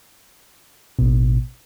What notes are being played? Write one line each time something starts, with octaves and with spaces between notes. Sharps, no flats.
A1 B2